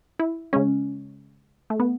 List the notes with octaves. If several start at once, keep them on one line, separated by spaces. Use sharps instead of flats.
E4
C#3 G#3 C#4
A3
B3